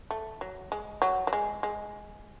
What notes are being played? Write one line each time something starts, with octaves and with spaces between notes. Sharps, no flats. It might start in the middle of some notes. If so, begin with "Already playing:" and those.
A3
F#3
G#3
F#3
F#3
G#3
G#3